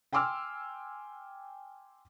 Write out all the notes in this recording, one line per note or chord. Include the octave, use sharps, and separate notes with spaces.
G5 G#5 C6 D6 E6 F6